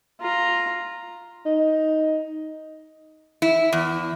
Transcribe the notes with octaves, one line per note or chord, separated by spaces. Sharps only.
F4 A#5
D#4
E4
E2